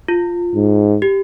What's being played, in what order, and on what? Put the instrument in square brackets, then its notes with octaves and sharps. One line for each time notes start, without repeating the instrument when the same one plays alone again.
[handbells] F4
[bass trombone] G#2
[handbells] G4